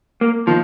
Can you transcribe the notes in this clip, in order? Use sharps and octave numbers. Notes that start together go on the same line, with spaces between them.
A#3
D#3 F3 A#3